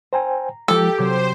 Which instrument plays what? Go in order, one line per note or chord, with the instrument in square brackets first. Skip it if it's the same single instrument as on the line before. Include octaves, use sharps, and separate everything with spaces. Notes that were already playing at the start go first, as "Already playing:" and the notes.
[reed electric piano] C5 G5 G#5 [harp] A#5
[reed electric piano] F3 G#3 [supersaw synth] G4 [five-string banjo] A4
[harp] C3 F#3 G6 [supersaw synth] C5 [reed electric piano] D6